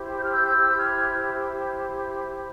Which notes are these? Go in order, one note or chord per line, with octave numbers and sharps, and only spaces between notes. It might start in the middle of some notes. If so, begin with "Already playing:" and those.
Already playing: E4 G4 C5
G6
F6
E6 G6
E6 G6
G6
F6 G#6